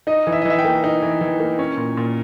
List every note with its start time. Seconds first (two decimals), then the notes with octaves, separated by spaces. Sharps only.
0.07 D#4 D#5
0.27 E3
0.32 E5
0.42 D#5
0.45 E3 E5
0.59 G5
0.65 A#3
0.84 D#4
1.02 E3
1.21 E3
1.40 A#3
1.59 C#4
1.77 A#2
1.97 A#2